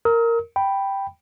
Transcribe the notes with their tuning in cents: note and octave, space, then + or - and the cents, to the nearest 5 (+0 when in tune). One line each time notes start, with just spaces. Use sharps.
A#4 -10 D#6 +45
G5 +0 B5 +0